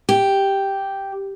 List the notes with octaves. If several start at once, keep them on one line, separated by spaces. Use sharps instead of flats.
G4